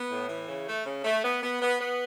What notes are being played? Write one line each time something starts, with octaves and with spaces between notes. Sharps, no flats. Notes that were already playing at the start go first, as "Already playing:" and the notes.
Already playing: B3
A2
E3
C#3
A3
C#3
A3
B3
B3
B3
B3